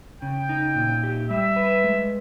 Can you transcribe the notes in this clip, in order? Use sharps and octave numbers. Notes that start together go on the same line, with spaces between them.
C#3 G5
D#4
A#2
G4
G3 E5
B4
G#3